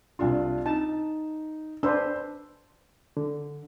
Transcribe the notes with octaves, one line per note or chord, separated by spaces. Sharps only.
C2 D4 F4
D#4 A5
D4 B4 C5 E6
D3